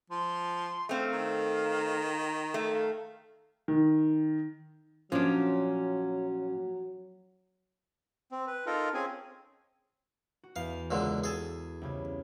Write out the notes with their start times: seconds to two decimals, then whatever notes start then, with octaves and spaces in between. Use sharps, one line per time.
0.10 F3 C6
0.89 A3 C4 F5
1.12 D#3
2.54 A3
2.71 F5
3.68 D#3
5.12 A#2 F3 F#3 C#4 D4
8.32 C4
8.47 B4
8.66 D#4 F4 A4 A#4
8.94 C4 C#4 G#4 G#5
10.43 F#4
10.56 E2 F5
10.91 C#2 A#2 D3
11.24 G#4 A4
11.81 C2 C#3 G#6